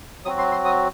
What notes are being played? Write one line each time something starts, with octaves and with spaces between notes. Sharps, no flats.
F#3 C4 F#4 D#6
C6
C6
D#6